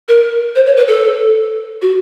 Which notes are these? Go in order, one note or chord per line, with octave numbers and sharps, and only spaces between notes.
A#4
C5
C#5
B4
A4
F#4